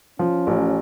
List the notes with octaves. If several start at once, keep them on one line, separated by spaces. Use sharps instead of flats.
F3 C#4
A1